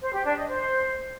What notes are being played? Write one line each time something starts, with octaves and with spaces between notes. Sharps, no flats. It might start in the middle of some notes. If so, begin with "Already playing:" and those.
C5
G4
D4
D#5
C5